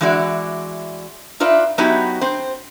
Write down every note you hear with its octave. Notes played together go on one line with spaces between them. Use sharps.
E3 G#3 E4 F#4 D5
D#4 F4 B4 D5 E5
F#3 B3 D#4 E4 F#4 G4
C4 C5